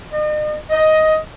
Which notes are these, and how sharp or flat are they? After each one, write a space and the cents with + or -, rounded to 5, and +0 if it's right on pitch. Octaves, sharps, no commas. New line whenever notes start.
D#5 -40
D#5 +10